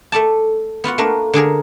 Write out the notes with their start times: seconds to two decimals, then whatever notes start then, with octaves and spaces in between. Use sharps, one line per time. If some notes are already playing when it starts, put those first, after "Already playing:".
0.12 A3 A4 D5 A5
0.84 B3 F4 F#4 F#5
0.98 A3 A#3 D4 A#4
1.33 D3 D4 G#4 A#4